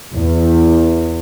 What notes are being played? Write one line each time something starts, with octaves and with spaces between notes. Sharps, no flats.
E2